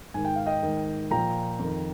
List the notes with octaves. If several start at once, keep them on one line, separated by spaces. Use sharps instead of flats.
G#2 D#3 G#5
G5
F5
D#5 G5
G#2 D#3
A#2 F3 G5 A#5
F2 D#3